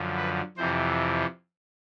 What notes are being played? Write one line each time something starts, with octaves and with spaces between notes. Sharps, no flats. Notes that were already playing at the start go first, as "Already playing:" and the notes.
Already playing: F#2 D3 F3
B4
F2 C3 E3 C5